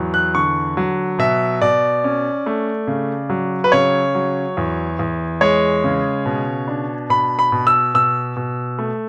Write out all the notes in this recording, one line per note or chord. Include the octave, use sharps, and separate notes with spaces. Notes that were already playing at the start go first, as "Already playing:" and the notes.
Already playing: E2 F#3
F#6
D3 C#6
F#3
B2 E5
B2 D5
C#4
A3
C#3
F#3
B4
C#3 C#5
F#3
E2
E2
G#3 C#5
C#3
B2
D4
B2 B5
B5
B2
E6
B2 E6
B2
A3